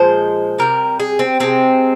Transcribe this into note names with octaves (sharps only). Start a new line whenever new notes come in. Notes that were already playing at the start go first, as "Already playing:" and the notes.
Already playing: A#2 F3 G#3 C5
C3 G3 A#4
G#4
C4
C3 F3 G#3 C4